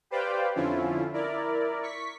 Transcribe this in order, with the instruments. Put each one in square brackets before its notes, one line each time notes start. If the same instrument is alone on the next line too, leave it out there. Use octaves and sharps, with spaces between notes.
[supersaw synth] G4 B4 C5 D5 F5 G5
F2 D3 F3 C#4 E4 F4
E4 A#4 D5
C#6 B6